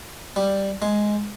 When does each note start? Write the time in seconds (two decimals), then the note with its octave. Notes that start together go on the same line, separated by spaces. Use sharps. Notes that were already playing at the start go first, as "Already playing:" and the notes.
0.36 G3
0.82 G#3